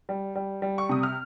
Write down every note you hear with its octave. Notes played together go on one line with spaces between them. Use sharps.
G3
G3
G3
C#6
C3 D#6
F6